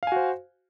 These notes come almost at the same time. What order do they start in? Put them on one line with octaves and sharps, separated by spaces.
F5 G#5 F#4 C5